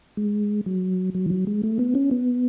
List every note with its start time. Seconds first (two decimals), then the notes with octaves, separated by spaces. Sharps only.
0.17 G#3
0.66 F#3
1.15 F#3
1.26 E3
1.30 F#3
1.47 G#3
1.63 A3
1.79 B3
1.95 C#4
2.11 B3